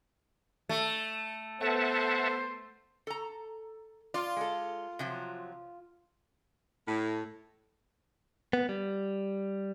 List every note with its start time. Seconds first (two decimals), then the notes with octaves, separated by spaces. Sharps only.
0.69 A3
1.61 B3 A4 C5 E5 F#5 A5
3.07 A4 A#5
4.14 F4 D5
4.36 G#3 A4
4.99 C3 F3 F#3
6.88 A2
8.53 B3
8.69 G3